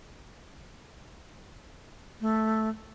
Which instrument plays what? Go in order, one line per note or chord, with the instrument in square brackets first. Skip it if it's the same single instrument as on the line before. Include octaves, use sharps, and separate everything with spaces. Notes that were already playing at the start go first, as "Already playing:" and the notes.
[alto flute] A3